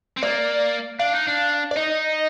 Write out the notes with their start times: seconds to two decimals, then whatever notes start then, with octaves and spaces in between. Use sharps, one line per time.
0.17 C4
0.23 A#3 D5
0.99 D4 F5
1.13 D#4
1.27 D4
1.71 D5
1.76 D#4 D#5